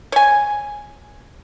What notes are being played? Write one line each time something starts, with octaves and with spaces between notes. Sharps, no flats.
C#5 G#5